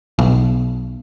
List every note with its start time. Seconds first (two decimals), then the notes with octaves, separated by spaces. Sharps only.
0.19 B1